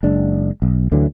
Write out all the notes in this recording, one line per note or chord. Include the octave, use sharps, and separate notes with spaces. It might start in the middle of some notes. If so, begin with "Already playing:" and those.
F#1 G#3 D4
B1
D2 D3 E3 F#3